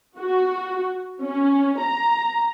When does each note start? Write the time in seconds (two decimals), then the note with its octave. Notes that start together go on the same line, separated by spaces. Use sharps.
0.18 F#4
1.21 C#4
1.80 A#5